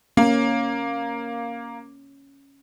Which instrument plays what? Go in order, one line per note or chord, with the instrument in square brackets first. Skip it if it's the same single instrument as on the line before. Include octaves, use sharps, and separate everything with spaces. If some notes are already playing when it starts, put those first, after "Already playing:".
[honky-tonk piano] A#3 [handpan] C#4